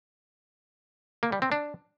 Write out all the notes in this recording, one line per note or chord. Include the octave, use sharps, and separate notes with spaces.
A#3
G3
C4
D4